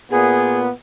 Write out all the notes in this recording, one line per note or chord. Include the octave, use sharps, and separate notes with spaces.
A#2 B3 G#4